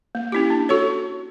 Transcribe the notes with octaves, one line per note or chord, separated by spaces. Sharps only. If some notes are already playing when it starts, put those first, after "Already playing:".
A#3
C#4 E4 G4
D4
F#4 A4 C#5